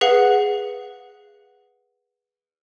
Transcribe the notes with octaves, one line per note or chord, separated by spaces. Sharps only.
G#4 B4 F5 F#5 C7